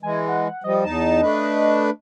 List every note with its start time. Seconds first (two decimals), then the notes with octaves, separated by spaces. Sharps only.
0.03 E3 G#3 G#5
0.28 F#5
0.64 F3 G3 D#5
0.84 E2 D#4 A5
1.21 A3 D4 B4